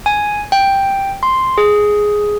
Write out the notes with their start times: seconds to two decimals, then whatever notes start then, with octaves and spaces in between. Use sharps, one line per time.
0.06 G#5
0.52 G5
1.23 C6
1.58 G#4